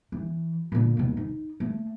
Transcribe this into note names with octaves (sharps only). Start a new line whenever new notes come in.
E3
A#2 D3
D#2 B2
D#4
A3